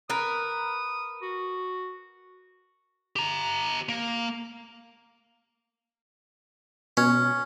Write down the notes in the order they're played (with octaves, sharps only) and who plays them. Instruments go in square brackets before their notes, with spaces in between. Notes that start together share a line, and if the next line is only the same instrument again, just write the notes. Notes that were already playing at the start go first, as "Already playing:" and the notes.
[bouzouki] A#4 B4 [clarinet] D#6
[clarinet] F#4
[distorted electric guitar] G4 A#5
A#3
[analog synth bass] B2 [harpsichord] C#4